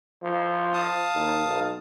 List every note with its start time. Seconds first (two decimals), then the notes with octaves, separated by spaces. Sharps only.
0.22 F3
0.73 F5 A5 D#6
1.15 D#2
1.45 B1